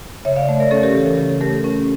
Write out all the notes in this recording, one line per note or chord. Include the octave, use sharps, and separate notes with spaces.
C#3 C#5 E5
D5 F5
A3
A#4 D5
C#4 A4 C#5
G4 A#4
E3 A4
A4
C#3 G4
A4
A3 G4 A#4
A4
C#4